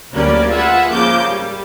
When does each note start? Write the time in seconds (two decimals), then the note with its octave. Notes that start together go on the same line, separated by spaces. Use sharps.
0.13 D2 F#3 G3 A#3 C#4 D5
0.50 F4 G#4 B4 E5 F#5
0.91 G#2 C#3 F3 A#3 D6 G6
1.26 G3